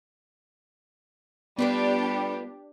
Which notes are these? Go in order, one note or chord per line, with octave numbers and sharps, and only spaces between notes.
G3 A3 B3 D4 F4 G4 B4